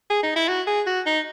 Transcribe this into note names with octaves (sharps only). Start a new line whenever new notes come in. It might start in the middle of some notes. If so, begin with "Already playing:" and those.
G#4
D#4
E4
F#4
G#4
F#4
D#4